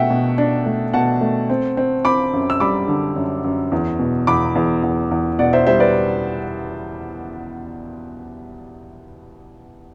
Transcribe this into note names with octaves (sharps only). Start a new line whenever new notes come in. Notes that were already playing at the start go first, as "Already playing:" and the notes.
Already playing: B2 A3 E5 F#5 G5
B2
D4
A3
B2 F#5 A5
A3
C4
C4
C4 B5 D6
F#2
E6
G3 B5 D6
D3
F#2
F#2
E2
B2
E2 B5 D6
E2
E2
E2
B2 D5 F#5
C5 E5
G3 C5 E5
B4 D5